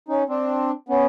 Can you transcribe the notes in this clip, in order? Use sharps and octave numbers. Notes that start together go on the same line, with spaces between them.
C#4 D#4
C4 D4
B3 C#4